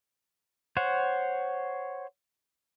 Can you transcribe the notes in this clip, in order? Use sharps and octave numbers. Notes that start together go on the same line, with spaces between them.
C5 C#5 F#5